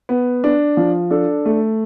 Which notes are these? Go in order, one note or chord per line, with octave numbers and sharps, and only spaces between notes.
B3
D4
F3
D4 A4
A3